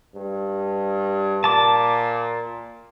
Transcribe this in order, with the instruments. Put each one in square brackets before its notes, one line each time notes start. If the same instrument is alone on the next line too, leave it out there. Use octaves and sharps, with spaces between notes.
[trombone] G2
[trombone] A#2 [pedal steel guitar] A5 D6